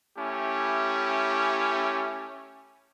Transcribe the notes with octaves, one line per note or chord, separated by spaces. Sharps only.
A3 C#4 E4 G4